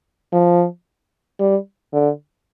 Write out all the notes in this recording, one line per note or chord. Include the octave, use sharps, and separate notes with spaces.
F3
G3
D3